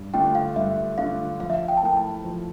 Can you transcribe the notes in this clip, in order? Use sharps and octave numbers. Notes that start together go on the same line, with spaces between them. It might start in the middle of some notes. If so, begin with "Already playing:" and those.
Already playing: G2
D3 A3 D4 F4 G5
F5
G2 E5
D3 A3 D4 F4 F5
F3 F5
E5
F5
G5
A5
A3 E4 A#4 G5
A5
F3